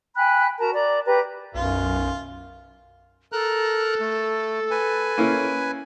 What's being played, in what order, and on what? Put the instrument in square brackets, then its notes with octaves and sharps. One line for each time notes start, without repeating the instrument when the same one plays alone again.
[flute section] G5 G#5 B5 F#6
F#4 A#4 A5 A#5
D5 A#5
G4 B4 G5 A#5
[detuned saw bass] B1 [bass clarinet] F#2 [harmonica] F4
[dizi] A4 [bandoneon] A#4 A#5 F#6
[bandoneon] A3
B4 G#5
[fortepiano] A#3 C#4 E4